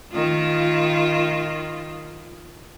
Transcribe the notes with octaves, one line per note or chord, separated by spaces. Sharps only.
D#3 F4